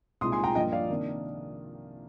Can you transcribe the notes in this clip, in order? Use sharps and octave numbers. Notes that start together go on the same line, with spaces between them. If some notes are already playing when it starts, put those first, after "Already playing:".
C2 A#2 G#3 C4 D#4 C6 D#6
G#5 C6
G5 A#5
G2 F3 A#3 F4 D#5 G5
D5 F5
C3 D#3 A#3 D4